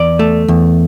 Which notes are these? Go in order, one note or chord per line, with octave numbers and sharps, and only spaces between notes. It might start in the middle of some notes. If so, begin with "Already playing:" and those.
Already playing: E2 D5
A3
E2